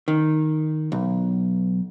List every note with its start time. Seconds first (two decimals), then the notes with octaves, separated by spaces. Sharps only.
0.08 D#3
0.92 B1